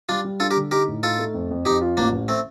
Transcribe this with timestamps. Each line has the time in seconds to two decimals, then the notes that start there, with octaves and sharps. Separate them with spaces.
0.09 G3 D4 F4
0.25 G3
0.40 D4 F4 A4
0.51 G4 A#4
0.56 D3
0.71 D#4 G4 A#4
0.88 A2
1.03 D#4 F4 A4
1.19 A3
1.34 F2
1.50 F2
1.65 F2 D#4 G4
1.81 F4
1.97 A1 A#3 D4
2.12 A1
2.28 A3 C4